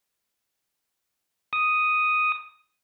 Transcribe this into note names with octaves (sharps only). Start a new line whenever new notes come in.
D#6